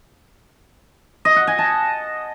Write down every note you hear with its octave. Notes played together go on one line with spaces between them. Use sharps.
D#5
F#5
G#5
A5